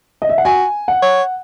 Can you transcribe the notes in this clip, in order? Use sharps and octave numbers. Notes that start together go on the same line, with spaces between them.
D#5
E5
F#5
F#4 G#5
F#5
C#5